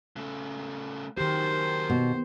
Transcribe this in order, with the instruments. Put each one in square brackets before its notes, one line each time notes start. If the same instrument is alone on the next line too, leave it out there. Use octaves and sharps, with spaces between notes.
[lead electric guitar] C#3 A3
[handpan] D#3 G4 [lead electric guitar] F#3 A#3 [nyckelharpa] C5
[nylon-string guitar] B2